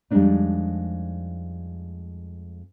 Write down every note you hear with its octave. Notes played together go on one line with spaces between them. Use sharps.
F2 G3 G#3 A#3 D4 D#4